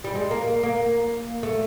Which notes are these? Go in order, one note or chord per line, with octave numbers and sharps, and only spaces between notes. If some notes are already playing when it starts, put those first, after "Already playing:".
G3
G#3
A#3
A#3
A3